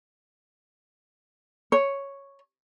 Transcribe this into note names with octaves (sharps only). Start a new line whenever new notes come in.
C#5